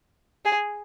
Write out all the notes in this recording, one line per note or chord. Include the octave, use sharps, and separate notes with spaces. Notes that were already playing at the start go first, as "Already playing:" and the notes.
G#4